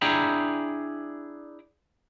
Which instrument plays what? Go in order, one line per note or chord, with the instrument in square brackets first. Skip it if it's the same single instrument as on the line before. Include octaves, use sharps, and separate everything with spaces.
[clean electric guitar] D4 E4 G#4 G5 A#5 B5